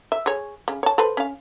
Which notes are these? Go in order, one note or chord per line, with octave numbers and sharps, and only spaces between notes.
E5
G#4 C#5
C#3
C#5 A5
A4 B4 C5
C#4 F5